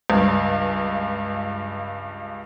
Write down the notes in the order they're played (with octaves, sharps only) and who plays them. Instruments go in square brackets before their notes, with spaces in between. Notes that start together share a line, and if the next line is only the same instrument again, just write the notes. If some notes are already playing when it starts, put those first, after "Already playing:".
[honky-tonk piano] C#2 G2